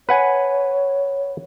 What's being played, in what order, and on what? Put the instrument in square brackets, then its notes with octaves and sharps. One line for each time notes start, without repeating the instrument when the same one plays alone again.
[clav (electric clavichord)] B4 F#5 G#5 [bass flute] C#5